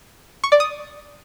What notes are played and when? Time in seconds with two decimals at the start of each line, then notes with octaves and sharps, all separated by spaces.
0.44 C#6
0.52 D5
0.60 D#6